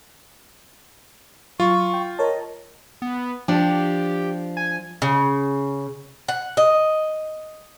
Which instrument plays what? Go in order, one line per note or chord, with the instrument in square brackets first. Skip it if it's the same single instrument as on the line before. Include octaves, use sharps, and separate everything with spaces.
[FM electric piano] F#3 [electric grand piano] F4 [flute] C#6
[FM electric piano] G5
[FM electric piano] A#4 C#5 A5 [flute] D#5
[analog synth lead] B3
[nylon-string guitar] F3 D4 [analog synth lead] G4
[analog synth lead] G#5
[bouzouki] C#3
F#5
D#5